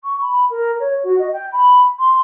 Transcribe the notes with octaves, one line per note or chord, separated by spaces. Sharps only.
C#6
B5
A#4
C#5
F#4
D#5
G5
B5
C6